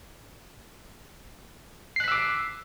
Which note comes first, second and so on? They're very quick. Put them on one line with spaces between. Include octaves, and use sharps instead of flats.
C7 F#6 B6 E6 D6